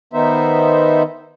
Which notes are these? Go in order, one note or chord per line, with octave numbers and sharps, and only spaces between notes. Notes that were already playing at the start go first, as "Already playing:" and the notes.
D#3 B3 D#4 C5 E5